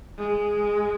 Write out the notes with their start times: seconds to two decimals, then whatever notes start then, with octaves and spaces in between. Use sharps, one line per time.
0.18 G#3